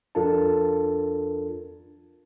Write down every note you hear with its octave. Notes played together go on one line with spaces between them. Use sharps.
F2 D4 F4 A4 A#4 A5